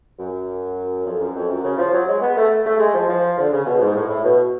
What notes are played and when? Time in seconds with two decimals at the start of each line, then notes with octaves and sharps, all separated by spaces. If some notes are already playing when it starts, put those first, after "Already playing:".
0.19 F#2
1.06 F2
1.20 F#2
1.36 F2
1.49 F#2
1.64 C#3
1.78 F3
1.93 F#3
2.08 G#3
2.21 B3
2.37 A3
2.65 A3
2.79 G#3
2.94 F3
3.09 F3
3.37 D3
3.52 C#3
3.66 B2
3.80 G#2
3.95 A2
4.09 A2
4.24 B2